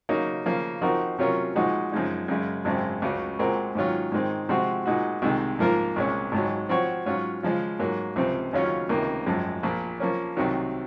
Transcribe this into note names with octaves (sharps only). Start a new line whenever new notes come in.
C#3 F#3 A#3 D#4
C#3 F3 A#3
F3 C4 D#4 F#4 A#4
C3 F#3 C#4 F4 A#4
A#2 F3 G#3 D#4 F#4
F#2 F3 G#3 D#4
F#2 C#3 G#3
G#1 F#2 C#3 G#3 C4
C#2 C#3 F#3
A#2 G#3 C4 F#4 A#4
G#2 D#3 F#3 C#4 F4
G#2 D#3 G#3 C4
C3 F3 G#3 C4 F#4
A#2 G#3 D#4 F#4
C2 C3 D#3 G#3
G#2 F3 A#3 F4 A#4
C2 A#2 G#3 C#4
G#1 G#2 F#3
F3 C4 F#4 C#5
G#2 F#3 C#4 F4
C#3 F3 G#3
G#2 F#3 A#3
C#2 C3 F3 C4
D#2 C#3 F#3 C#4 F4
C#2 C3 D#3 A#3
G#1 F#2 F3 G#3
A#1 A#2 F3
F3 A#3 C#4
C2 C3 D#3 F#3